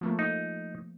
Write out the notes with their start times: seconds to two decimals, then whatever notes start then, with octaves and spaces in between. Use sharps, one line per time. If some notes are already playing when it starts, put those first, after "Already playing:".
0.01 F3 A3 A#3
0.19 D#4